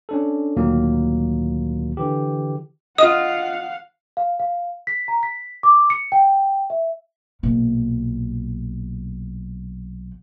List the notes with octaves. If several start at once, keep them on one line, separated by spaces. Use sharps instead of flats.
C#4 D4 A4
D2 A#2 D#3 F#3 A#3
D3 E3 G4
F4 D#5 F5 F#5 D#6
F5
F5
B6
A#5
B6
D6
C#7
G5
E5
B1 A#2